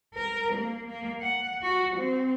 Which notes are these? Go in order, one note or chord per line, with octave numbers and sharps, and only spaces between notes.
A#4
A#3
A#3
F#5
F#4
C4